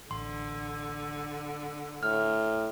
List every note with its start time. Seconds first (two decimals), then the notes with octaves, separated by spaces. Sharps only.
0.11 A1 D3 C6
2.03 A2 F6